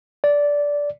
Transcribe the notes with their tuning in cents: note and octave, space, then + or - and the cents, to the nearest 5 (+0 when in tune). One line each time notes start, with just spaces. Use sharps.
D5 -15